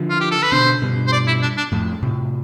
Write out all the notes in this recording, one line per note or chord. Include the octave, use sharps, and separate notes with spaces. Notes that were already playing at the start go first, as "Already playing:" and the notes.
Already playing: D3 F3
F4
G4
A4
B4
B2 D3 C5
G2 B2
C5
D5
E4
D4
D4
F2 A2
A2 C3